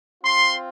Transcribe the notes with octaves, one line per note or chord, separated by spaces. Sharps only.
C4 F4 C6